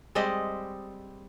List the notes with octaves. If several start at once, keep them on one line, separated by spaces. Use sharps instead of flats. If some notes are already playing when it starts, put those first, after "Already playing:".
G3 G#3 C4 D#5